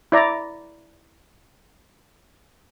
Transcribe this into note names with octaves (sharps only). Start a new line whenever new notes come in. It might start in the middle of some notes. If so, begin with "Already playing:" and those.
E4 D5 A#5